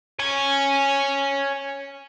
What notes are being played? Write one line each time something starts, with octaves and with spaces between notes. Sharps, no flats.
C#5 G#5